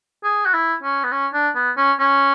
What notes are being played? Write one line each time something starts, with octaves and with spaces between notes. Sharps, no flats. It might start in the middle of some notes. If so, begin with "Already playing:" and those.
G#4
F#4
E4
C#4
B3
C#4
D4
B3
C#4
C#4